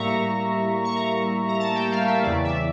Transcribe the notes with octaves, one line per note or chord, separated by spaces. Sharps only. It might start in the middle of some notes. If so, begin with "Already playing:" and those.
Already playing: A2 G3 A#3 E5 A#5 C#6
C#6
A#5
A#5
A5
G5
F5
E5
E2 C#3 E3 D5
E5